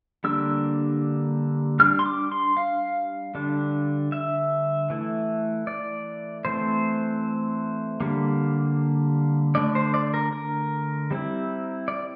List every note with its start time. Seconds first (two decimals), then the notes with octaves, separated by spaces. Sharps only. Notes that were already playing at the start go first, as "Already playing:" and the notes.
0.24 D3 G3 A#3 D4 E6
1.80 G3 D4 F6
1.99 C6
2.06 D6
2.32 C6
2.57 F5
3.35 D3 G3 D4
4.12 E5
4.90 E3 A3 E4
5.67 D5
6.45 E3 A3 C4 C5
8.00 D3 G3 A#3
9.55 D3 A3 D4 D5
9.75 C5
9.94 D5
10.14 A#4
10.33 A#4
11.11 G3 C4 E4
11.88 D5